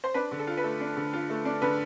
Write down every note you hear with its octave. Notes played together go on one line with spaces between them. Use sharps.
C5
D4 B4
D3
A4
F4
B4
A3 A4
D4
D3
F4
A3
D4
D3 B4